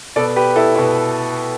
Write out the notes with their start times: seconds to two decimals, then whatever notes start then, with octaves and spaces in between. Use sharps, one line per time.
0.16 B2 B3 A4 D5
0.36 G4 B4
0.56 E4 A4
0.76 B2 B3 E4